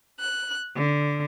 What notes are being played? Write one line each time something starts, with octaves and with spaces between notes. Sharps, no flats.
F#6
D3